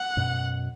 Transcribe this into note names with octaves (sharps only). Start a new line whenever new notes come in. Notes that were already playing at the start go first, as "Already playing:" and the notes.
Already playing: F#5
F#2 B2